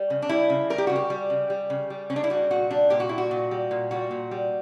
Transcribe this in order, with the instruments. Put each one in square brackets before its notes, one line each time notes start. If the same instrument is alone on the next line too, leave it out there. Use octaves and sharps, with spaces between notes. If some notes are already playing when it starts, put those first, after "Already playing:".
Already playing: [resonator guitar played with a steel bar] G3
C#3
D4
G3 E4
C#3
G3 A#4
G4
C#3 F#4
G4
G3
C#3
G3
C#3
G3
C#3 C#4
D4
E4
G3 F#4
A#2 F#4
G3 D4
A#2 G4
F#4
G3 E4
F#4
A#2
G3
A#2
G3 F#4
A#2
G3